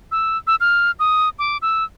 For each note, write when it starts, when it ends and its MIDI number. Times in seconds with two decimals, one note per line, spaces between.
0.11 0.37 88
0.47 0.56 88
0.60 0.91 89
0.99 1.29 87
1.39 1.57 86
1.62 1.84 88